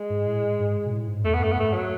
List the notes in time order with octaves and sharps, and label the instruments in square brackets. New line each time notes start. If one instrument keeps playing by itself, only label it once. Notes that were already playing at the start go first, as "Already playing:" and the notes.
Already playing: [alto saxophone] G#3
[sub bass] G#2
A2
G#2
B2
A2
G#2
[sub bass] E2 [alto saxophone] A3
[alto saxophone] B3
[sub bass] F#2 [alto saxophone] A3
[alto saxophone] B3
[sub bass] G#2 [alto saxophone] A3
[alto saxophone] F#3